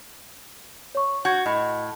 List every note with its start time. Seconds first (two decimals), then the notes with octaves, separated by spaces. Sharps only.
0.95 C#5 C#6
1.25 F#4 G6 G#6
1.46 A2 D#5